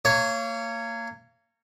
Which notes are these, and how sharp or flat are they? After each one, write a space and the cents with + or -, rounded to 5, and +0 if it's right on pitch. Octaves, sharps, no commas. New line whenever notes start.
A#3 -30 C#5 +0